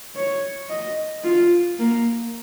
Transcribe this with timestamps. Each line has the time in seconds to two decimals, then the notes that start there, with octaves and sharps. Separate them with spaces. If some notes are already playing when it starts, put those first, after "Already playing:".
0.16 C#5
0.70 D#5
1.25 F4
1.79 A#3